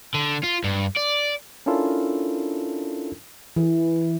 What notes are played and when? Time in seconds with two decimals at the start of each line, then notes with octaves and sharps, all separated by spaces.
0.14 D3
0.44 F4
0.64 G2
0.96 D5
1.66 C#4 D4 E4 F4 A4 A#4
3.56 E3